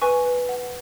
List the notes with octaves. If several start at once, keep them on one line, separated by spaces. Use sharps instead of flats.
B4 G#5 C#6
B4
F#5